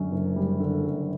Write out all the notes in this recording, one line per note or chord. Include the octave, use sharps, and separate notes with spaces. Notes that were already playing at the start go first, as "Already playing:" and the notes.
Already playing: F#2 D3
F#1
G3
D3
F#2